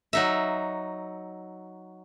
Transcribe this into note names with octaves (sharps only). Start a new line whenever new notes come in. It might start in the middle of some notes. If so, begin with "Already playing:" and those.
F#3 D#4 E5